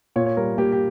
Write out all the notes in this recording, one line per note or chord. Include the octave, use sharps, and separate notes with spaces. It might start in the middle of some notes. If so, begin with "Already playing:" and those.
A#2 C#5
C#5
G3 A#4
A#3 G4
G4